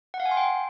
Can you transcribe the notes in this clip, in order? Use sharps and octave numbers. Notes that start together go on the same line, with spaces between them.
F#5
F5
G#5
C6
G5